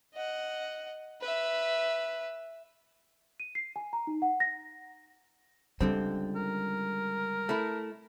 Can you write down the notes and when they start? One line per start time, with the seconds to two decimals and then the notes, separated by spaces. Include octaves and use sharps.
0.14 D#5 F#5
1.21 B4 E5
3.40 D#7
3.55 C7
3.76 G#5
3.93 A#5
4.07 D#4
4.22 F#5
4.40 A#6
5.81 C#2 D3 G3 C4
6.36 A#4
7.49 A3 E4